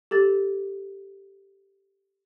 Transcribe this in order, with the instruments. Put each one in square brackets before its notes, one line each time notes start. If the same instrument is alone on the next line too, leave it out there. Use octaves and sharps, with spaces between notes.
[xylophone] G4 A4 A6